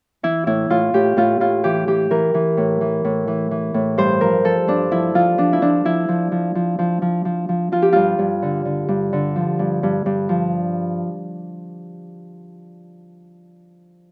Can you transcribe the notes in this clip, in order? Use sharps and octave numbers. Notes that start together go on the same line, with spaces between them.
E3 E4
A2 E4
A2 F4
A2 G4
A2 F4
A2 F4
E3 G4
E3 G4
E3 A#4
E3
A2
E3
A2
E3
E3
A2
G2 C5
F3 A#4
F3 A4
G2 D4
F3 E4
F3 F4
F3 D4
E4
F3 D4
F3 E4
F3
F3
F3
F3
F3
F3
F3
F3 F4
G4
G2 F4
G2
D3
D3
G2
D3
F3
G2
G2
G2
F3